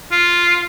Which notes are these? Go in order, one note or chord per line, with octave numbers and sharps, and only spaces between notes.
F4